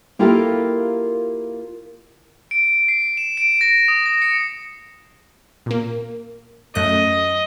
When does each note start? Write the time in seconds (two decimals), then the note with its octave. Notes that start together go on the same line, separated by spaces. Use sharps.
0.19 A#3 E4 F4 G4 A4 A#4
2.51 D7
2.88 C7
3.17 E7
3.37 D7
3.61 A#6
3.88 D#6
4.06 A#6
4.22 C#7
5.66 A#2 A#3
6.75 F#2 A3 D#5 F#6